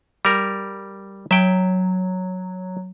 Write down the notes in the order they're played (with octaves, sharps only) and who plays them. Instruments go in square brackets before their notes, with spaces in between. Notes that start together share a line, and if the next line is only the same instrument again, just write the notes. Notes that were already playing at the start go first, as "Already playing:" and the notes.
[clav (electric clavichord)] G3 A#4
[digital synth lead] F#3 [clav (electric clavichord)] E5 G5